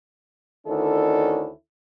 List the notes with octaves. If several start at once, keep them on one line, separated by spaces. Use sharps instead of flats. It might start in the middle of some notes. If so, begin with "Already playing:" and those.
D2 D#3 C#4 D4 E4 A4